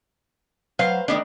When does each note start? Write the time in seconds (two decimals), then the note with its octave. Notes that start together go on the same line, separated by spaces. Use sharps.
0.79 F#3 B4 C5 F5
1.08 D#3 A3 B3 D4 D#5